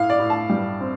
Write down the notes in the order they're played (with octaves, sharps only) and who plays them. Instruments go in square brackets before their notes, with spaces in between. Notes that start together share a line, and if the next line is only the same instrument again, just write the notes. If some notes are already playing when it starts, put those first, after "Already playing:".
Already playing: [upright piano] A2 F5
D5
A2
A5
G3
C4